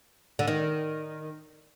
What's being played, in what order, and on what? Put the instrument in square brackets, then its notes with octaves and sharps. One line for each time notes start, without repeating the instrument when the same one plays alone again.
[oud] D3
D#3